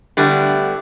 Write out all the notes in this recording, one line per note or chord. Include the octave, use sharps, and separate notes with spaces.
D3 G3 A3 B3 E4